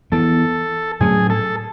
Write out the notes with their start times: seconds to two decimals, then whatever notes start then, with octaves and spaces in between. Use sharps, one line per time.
0.12 E3 B3 A4
1.01 A2 F#3 A3 C#4 G#4
1.30 A4